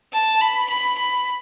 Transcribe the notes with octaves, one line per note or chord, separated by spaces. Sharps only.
A5
B5
B5
B5